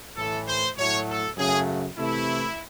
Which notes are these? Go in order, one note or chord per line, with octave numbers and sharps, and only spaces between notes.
A2 E3 A3 A4
C5
A2 F#3 A3 C#5
A4
F#2 C#3 F#3 A3 G#4
C3 E3 A3 E4